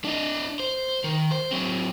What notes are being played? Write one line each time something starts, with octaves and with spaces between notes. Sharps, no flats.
D4 D#5
C5
D#3
C5
F#3 C4